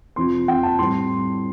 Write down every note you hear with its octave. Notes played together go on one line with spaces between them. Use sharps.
F2 C3 F3 C6
F2 C3 F3 G5
A5
A2 G3 C4 C6